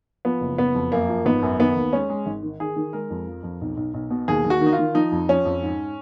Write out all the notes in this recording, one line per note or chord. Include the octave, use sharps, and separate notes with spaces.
F3 B3
F#1
F#1 B3
F2
F#2 A#3
F3
G#1 B3
F#2
D#3 B3
D#2
G#3 C#4
G#3
G#1
D#3
D#3 G#4
D#3
G#3 A#4
F2
F3
F2
B1
B1
B1
B2
D#2 G#4
D#2
F#4
D#3
D#4
F4
D#3
F3 D#4
F2
F3 C#4
F2
G#2